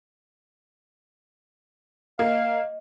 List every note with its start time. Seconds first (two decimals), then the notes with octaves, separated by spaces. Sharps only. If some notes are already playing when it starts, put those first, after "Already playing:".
2.19 A#3 D#5 F5